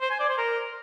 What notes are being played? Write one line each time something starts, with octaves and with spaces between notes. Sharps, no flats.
C5
G#5
D5
C5
A#4